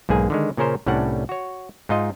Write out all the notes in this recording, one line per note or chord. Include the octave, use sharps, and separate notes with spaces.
B1 G#2 A#3 G#4 G#5
D3 D#3 G#3
A#2 C#3 C#4 A#4 C5
C2 A2 G3 C#4 D4 F#5
F#4 C#5
G#2 D#4 F4 D#5